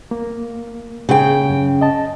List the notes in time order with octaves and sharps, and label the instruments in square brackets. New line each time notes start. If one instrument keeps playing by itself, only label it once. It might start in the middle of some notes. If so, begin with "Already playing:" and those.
[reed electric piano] A#3
[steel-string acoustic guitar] C#3 G5
[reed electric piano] F#2
D#5 A5